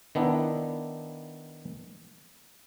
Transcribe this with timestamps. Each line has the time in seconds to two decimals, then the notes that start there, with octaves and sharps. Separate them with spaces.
0.15 D#3 B3 D4 E4